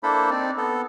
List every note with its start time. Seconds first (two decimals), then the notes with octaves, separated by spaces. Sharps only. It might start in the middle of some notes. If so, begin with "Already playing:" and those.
0.03 A#3 D4 E4 A4 C5 B5
0.30 C4 D#4 D5
0.58 B3 A4